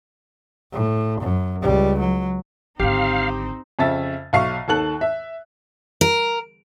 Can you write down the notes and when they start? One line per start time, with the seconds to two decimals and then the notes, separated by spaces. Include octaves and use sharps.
0.72 A2
1.21 F#2
1.62 C#2 G3
1.99 F#3
2.80 G#1 D3 C4 D#4 G4 F5
3.79 F2 C#3 E5 A6
4.33 B1 E5 F5 C#6 C7
4.68 D#2 D#3 A4 A5 F#6 F#7
5.01 E5
6.01 A#4